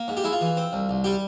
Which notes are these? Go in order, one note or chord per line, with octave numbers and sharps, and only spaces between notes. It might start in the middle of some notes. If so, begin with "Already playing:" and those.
Already playing: A#3
G#2
G4
G#3 E4
F4
E3
C4
C2
C2
G3 G4